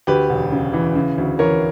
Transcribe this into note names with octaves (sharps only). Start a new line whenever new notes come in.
D2 G4 B4
E1
C#3
E3
C#3
D2
E3 A#4 C#5